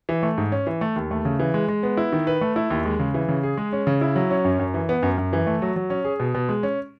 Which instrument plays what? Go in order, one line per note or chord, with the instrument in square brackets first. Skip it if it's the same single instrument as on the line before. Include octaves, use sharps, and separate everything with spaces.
[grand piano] E3
A3
G#2
C#4
E3
A3
D#2
A3
C#3
E3
G#3
G#3
B3
E4
D#3
B4
A3
E4
D#2
G#3
C#3
E3
C#3
G#4
G#3
C#4
C#3
E4
F#3
C#4
F#2
F#2
E3
B3
F#2
F#2
E3
A3
F#3
F#3
C#4
G#4
B2
B2
G#3
C#4